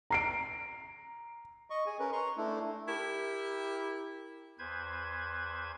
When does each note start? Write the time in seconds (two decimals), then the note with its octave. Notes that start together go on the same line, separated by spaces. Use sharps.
0.10 A#5 C7 D7
1.70 D#5 C#6
1.86 G#4 G#5
2.00 C#4 A#4 B4
2.12 A#5 C6 C#6
2.37 A3 D4 E4
2.87 E4 G4 A#4
4.59 E2 B4 C5 G#6